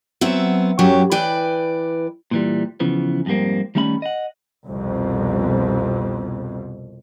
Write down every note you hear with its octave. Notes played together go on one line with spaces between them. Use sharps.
F#3 B3 C4 E5
F#2 F#3 G4 C#5
E3 B4 D5 G5
A#2 E3 G3
C#3 E3 F3 B3
F2 G#2 G3 A#3 C4
D#3 G3 A3 C#4 F5 B5
D#5 F#5
C2 F2 B2